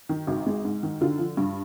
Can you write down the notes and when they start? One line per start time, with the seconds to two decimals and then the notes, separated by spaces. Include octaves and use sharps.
0.09 D#3
0.27 G#1
0.47 G#3
0.65 G#2
0.83 D#3
1.01 D3 F4
1.19 F3
1.37 G2